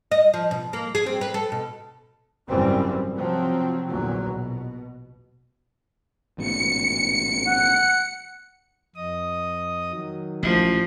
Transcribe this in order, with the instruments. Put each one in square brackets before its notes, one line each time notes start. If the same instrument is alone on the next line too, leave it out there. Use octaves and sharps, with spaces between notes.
[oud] D#5
F3
B2
A#3
G#4
C4
B4
A4
B2
[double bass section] G#1 F#2 C#3 E3 G3 C4
C3 F3 F#3 C4
A#1 E2 D3 F#3
B2
[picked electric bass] A1 G#2 B2 [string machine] C#7
[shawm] F#5
[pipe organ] F2 D#5 D#6
D#3 F#3
[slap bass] A1 A#2 [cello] F3